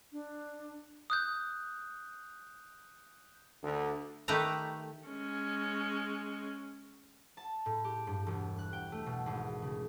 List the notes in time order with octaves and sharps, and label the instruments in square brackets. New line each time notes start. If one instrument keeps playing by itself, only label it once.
[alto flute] D4
[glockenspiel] D#6 F#6 G6
[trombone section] D2
[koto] D#3 A3 G4 B4 A5 A#5
[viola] G#3 C#4
[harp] A5
A2
G4
G2
E1
F#6
G5
A3
B2
G#1
C#3